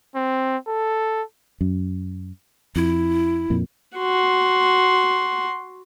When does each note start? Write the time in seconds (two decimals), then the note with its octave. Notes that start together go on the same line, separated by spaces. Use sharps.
0.16 C4
0.68 A4
1.61 F#2
2.76 F2 E4
3.50 F2 A#2
3.97 F#4 C6